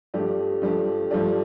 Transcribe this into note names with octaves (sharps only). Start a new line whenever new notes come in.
G2 F3 A3 D4 G4
G2 F3 A3 D4 G4
G2 F3 A3 D4 G4